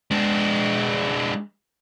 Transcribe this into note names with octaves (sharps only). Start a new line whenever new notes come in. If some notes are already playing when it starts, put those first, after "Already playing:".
G#3 D4